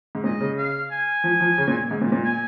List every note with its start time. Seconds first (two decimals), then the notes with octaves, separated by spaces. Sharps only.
0.15 G#2
0.24 A#2 D#5
0.41 C#3
0.58 F5
0.91 G#5
1.24 F3
1.40 F3
1.58 C#3
1.68 A#2
1.91 G#2
2.02 A#2
2.12 A#2
2.24 G#5